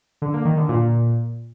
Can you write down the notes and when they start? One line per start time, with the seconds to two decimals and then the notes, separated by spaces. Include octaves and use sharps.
0.22 D3
0.33 A#3
0.45 D#3
0.57 D3
0.69 A#2